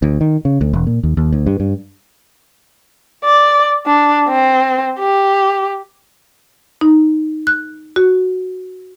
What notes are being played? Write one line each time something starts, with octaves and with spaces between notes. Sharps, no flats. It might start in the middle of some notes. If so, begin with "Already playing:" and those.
D2
D#3
C#3
D2
E1
A#2
D#2
D#2
D2
G2
G2
D5
D4
C4
G4
D#4
F#6
F#4